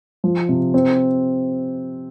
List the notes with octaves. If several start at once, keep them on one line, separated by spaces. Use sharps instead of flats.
F3
C3
C4